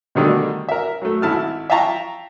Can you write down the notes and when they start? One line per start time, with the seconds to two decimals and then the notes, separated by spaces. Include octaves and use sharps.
0.15 B2 D3 D#3 G3 A3
0.69 A#4 E5
1.02 F#3 A3
1.22 G#1 E4 A5 F6
1.70 E5 F5 G5 A5 A#5 C#6